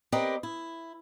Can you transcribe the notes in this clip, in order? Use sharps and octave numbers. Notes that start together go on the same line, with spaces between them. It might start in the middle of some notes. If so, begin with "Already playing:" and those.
C4 G4 A#4 B4 D5 D#5
E4